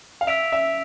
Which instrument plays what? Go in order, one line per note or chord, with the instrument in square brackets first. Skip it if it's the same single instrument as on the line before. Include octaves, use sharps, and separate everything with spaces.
[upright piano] F5
[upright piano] E5 [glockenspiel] E6 B6 D7 F7
[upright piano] E5